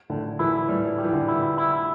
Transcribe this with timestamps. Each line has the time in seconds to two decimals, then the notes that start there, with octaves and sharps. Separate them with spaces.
0.10 A2 D3
0.39 E3 E4
0.68 A2 G3
0.98 G3
1.04 E3
1.13 D3
1.28 E4
1.58 E4